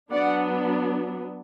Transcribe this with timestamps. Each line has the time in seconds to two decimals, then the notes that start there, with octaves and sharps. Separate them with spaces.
0.12 F#3 B3 D4 D5 F#5